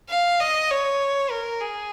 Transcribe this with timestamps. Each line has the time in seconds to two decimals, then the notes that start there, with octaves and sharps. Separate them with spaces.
0.10 F5
0.40 D#5
0.71 C#5
1.30 A#4
1.61 G#4